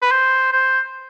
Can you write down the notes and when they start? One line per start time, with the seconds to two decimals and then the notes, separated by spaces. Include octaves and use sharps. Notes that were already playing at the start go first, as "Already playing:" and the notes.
0.02 B4
0.11 C5
0.53 C5